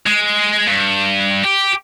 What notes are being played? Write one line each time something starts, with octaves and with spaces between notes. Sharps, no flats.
G#3
G2
G4